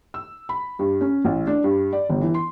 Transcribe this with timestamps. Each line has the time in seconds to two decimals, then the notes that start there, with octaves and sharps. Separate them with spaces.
0.14 E6
0.49 B5
0.79 G2
1.01 C#4
1.25 A1
1.47 D4
1.64 G2
1.93 D5
2.09 G1
2.21 E3
2.34 C6